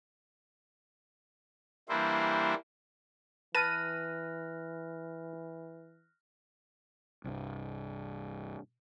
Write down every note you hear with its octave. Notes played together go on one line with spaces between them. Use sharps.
E3 G3 A#3 D4 E4 C5
E3 B4 A5 F6 F#6 A#6 D#7
C2 G2